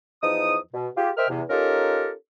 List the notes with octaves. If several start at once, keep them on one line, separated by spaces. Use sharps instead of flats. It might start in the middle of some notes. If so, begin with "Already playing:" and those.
E2 F3 D#4 D#6
B2
F4 G4 G#4
A#4 C5 D#5 E5 G5 F6
E2 C3
C#4 D#4 F4 G4 A4 A#4